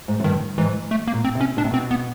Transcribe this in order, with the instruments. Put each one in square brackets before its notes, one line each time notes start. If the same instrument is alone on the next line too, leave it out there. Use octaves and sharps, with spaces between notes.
[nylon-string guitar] G#2
F#2
[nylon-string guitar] G2 [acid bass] D#3
[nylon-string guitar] G#2 [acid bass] E3
[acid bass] A3
A#3
[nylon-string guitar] A#2
[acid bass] C4
[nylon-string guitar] C3
[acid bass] C#4
[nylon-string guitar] B2 [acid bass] D4
[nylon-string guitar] C3
[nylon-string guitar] B2 [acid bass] C4
[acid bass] B3